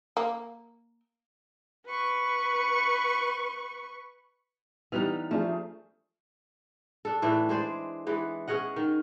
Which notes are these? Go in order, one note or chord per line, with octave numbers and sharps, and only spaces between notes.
A#3
B4 C#6
E3 G3 B3 D#4 F6 F7
F3 A3 D4 G#4
D4 A4
A2 E3 D4 E4
G#3 G#4 C5 D5
E3 G#3 B3
C#4 G#4 D#5 F#5
D#3